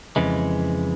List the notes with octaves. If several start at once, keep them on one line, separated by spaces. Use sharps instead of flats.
F2 C#3 E3 G#3